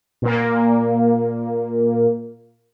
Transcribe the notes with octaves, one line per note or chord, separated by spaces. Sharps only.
A#2 A#3